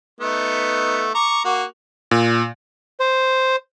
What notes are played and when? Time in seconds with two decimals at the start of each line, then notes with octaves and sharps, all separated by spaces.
0.20 A3 B3 D#4
1.14 A#5 C#6 D6
1.44 A#3 F#4
2.11 A#2
3.00 C5